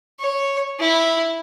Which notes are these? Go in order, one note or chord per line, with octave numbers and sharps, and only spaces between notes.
C#5
E4